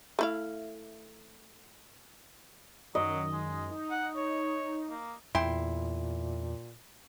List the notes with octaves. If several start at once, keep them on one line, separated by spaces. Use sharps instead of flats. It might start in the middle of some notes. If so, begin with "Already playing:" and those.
A3 E4 F5
F#2 D#3 F#3 D#5
G#3
D#4
F#5
C#5
A#3
E2 A#2 E4 G5 C6